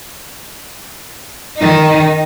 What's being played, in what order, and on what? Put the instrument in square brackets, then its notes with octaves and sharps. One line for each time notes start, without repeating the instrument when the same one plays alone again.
[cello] D#3 D#4